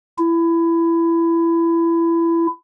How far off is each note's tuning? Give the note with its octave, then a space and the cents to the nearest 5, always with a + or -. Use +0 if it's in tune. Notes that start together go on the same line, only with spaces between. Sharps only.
E4 +20